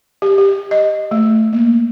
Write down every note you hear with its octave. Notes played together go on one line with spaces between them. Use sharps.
G4
G4
D#5
A3
A#3